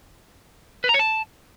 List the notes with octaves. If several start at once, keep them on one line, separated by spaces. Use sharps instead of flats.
B4
A#5
C#5
A5